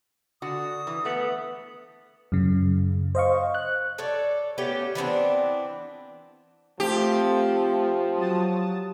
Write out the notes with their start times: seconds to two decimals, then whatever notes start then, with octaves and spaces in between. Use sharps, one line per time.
0.42 D3 F#4 D#6
0.87 E3
1.05 A3 B3
2.32 F#2 C#3
3.15 C5 D#5 F5 C#6
3.55 F#6
3.98 A4 C#5 D5
4.58 A3 B3 C#4 G4
4.95 E3 B3 C4 D4
6.80 F3 A3 C4 G4
8.14 F#3 A5 D#6